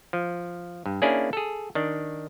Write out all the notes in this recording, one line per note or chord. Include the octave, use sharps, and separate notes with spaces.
F3
G2
A#3 C#4 D4 E4 G#4 D5
G#4 A4
D#3 D4